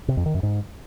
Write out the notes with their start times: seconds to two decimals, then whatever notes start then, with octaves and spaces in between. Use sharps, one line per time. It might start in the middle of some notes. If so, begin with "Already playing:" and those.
0.08 C3
0.17 F2
0.26 D#3
0.34 F#2
0.43 G#2